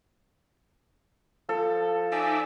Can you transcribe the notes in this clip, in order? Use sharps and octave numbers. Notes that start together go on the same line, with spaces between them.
F3 A4
D#4 D5 E5 G#5